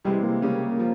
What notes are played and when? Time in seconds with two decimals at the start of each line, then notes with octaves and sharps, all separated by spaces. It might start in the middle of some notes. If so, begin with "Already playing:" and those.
0.05 C3 E3 G3 G#3 E4
0.23 A#3
0.42 C#3 G3 C#4
0.79 F3